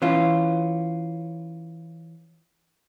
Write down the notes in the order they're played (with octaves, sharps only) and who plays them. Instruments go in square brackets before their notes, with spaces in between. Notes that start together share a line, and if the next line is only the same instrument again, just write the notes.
[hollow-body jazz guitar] E3 C#4 F4